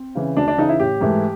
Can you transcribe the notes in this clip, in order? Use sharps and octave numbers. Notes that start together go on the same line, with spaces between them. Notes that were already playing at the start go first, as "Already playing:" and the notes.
Already playing: C4
C#3 E3
D2 D4
D4
C#3 E3 D#4
E4
A1 G4
G#2 E3 A3